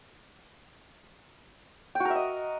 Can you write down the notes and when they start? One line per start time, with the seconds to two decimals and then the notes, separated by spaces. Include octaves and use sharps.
1.95 G5
2.00 F#4
2.05 A#4
2.10 E5
2.15 D#5